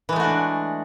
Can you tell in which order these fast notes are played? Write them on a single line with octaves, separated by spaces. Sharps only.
E3 G#3 A3 F#4 D4